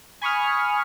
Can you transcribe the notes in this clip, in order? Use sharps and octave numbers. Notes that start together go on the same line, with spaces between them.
G#5 B5 C#6 D#6 F6